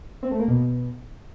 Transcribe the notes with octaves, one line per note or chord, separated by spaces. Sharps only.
C4
A3
A#3
B2